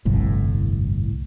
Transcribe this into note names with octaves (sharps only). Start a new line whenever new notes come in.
G1 C2 F2 A2